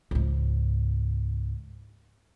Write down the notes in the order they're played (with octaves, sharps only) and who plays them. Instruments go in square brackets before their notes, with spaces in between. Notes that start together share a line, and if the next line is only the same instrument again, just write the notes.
[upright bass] C#2 G#2